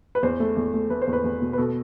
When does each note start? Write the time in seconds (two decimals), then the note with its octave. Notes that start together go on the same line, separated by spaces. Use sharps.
0.15 B4
0.23 E2 C5
0.40 A3
0.56 E2
0.73 A3
0.90 A3 B4
1.02 C5
1.07 E2
1.13 B4
1.24 E2
1.41 B2
1.53 B4
1.58 B2 A4